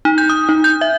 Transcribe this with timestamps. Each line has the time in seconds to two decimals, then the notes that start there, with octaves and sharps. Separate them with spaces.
0.05 D#4
0.18 G6
0.29 D#6
0.49 D#4
0.64 G6
0.81 E5